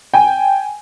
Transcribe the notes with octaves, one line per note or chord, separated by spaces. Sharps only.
G5 G#5